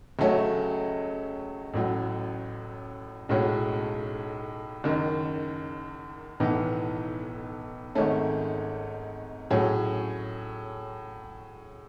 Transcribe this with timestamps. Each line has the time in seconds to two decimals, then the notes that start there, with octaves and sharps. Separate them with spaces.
0.19 C#2 C#3 F#3 A3 C#4
1.74 A1 A2 F#3
3.29 B1 A2 G#3 C#4 F#4
4.84 F#1 F#2 D#3
6.40 B1 A2 E3 B3 D#4
7.95 G#1 G#2 D#3 A3 C#4
9.50 A2 F#3 C#4 G#4